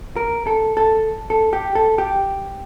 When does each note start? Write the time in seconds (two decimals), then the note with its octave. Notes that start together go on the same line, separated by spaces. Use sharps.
0.16 A#4
0.47 A4
0.77 A4
1.30 A4
1.53 G4
1.75 A4
1.98 G4